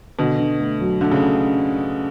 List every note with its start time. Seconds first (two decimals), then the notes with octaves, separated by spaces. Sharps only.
0.19 B2 D3
0.39 D3
0.59 A3
0.81 F#3
1.01 D3 A3
1.11 C#3